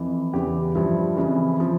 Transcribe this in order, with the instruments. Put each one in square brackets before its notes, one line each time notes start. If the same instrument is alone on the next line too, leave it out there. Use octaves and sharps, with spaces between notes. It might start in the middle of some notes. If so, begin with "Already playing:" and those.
Already playing: [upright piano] F2 E3
E2 C#3 E3 G4
G2 F3 E4
F2 C#3 E3
C#3 F3